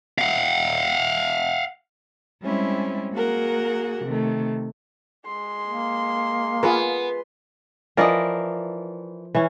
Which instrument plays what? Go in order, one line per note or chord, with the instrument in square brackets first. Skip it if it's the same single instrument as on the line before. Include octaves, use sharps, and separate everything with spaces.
[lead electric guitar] F5 F#5
[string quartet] G3 G#3 C4 C#4 E4
A#3 F#4 G#4 A#4 F#5
C3 D#3 A3
[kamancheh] G#3 C6
[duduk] A#3
[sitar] B3 [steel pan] F4 G#4 A#4
[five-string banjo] E3 E4 D#5 [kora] F3 A#4 D5
[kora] E3 C#4